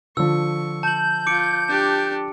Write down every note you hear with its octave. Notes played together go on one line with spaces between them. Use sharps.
D3 F3 C#6 E6
A5 G6 F#7
F4 D6 C#7 D7
D4 G4